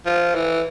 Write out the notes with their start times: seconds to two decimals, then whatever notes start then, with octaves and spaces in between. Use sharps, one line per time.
0.06 F3
0.35 E3